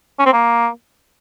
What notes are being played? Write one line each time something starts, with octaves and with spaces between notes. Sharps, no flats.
C#4
C4
A#3